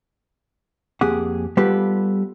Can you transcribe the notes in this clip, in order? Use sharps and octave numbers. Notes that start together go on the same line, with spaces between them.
F2 A#3 G4 G#4 F#5
G3 B3 F4 G4 A4 B4